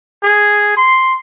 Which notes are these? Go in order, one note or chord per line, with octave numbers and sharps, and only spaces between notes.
G#4
C6